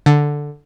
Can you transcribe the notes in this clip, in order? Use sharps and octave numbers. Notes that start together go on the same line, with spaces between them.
D3